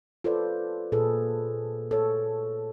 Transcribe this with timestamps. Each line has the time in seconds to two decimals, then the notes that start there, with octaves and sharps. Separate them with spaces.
0.24 F4 A4 B4 C5 D5
0.92 A#2 G#4 A4 B4
1.91 A4 C#5